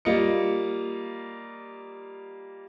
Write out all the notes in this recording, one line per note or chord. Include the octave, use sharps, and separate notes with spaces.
G3 A#3 F4 D#5 C#7